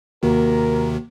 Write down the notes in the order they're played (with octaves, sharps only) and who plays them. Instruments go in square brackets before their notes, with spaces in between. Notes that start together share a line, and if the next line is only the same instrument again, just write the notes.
[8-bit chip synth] D#2 C3 D#3 [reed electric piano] A#3 F#4 [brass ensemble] A#4